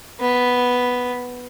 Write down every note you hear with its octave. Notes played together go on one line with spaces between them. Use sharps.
B3